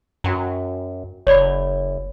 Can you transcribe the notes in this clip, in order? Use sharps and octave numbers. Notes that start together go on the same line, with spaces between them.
F#2 F#4 G5 A#5
F#1 C#5 D5 B5